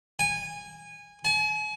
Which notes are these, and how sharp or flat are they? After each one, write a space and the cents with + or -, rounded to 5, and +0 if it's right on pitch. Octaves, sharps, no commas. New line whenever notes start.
G#5 -20
G#5 +40